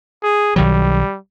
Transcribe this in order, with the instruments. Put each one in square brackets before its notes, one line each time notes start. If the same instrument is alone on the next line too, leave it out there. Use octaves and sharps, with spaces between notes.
[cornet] G#4
[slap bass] B1 D#3 F#3 [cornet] G3